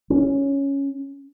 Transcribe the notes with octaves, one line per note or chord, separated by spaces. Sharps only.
C#4